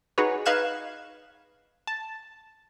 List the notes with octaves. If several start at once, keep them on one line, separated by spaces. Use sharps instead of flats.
D#4 F#4 G#4 B4 C#5
D#4 B4 F5 F#6 G#6 E7
A5